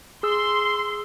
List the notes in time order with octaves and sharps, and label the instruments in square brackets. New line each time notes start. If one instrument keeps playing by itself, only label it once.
[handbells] G#4 E6 [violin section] C6